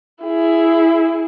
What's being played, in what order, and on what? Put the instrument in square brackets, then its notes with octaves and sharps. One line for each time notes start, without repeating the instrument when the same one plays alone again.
[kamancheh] E4 G#4